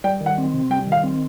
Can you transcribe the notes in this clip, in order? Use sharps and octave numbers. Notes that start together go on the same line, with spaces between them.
G3 G5
D#3
F#5
C4
C3
G3 G5
D#3
F5
C4